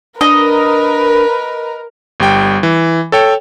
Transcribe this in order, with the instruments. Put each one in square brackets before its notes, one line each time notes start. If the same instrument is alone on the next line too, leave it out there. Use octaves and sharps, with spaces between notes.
[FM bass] D4 [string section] A#4 [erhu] B4 [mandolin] D#5
[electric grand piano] G1 G3 G5
E3
A4 C#5 G5